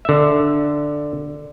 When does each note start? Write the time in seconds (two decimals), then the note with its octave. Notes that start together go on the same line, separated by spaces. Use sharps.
0.05 D3 E5